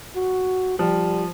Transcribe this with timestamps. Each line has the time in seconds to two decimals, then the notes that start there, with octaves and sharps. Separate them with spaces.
0.16 F#4
0.79 F3 G3